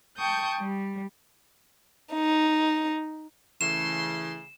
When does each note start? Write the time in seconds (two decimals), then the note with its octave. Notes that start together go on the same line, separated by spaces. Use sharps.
0.17 G5 A5 C#6 D#6 G6
0.59 G3
2.14 D#4
3.61 C#3 E3 A3 C6 E7